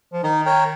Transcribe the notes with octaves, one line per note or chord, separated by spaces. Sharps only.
F3
D#3 D#4
A#4 C#5 G5